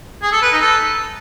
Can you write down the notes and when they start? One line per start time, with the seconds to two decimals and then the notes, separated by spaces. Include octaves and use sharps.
0.23 G#4
0.32 A4
0.42 B4
0.52 D#4
0.62 A4